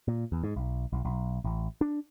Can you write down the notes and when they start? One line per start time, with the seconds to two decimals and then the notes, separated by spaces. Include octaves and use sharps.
0.08 A#2
0.32 E2
0.43 G#2
0.56 B1
0.92 B1
1.05 B1
1.44 A1
1.81 D4